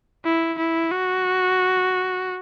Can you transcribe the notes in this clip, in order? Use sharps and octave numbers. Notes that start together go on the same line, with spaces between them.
E4
E4
F#4